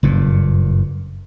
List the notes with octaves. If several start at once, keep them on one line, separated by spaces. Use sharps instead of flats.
F#1 G2 A#2